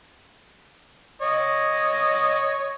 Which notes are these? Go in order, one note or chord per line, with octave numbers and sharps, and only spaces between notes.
C#5 D#5